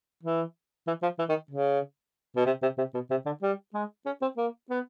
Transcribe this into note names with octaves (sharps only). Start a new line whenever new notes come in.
E3
E3
F3
E3
D#3
C#3
B2
C3
C3
C3
B2
C3
D3
G3
G#3
C#4
C4
A#3
B3